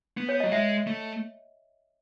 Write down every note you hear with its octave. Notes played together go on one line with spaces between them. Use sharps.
B3
C#5
F#3 D#5
G#3 E5
A3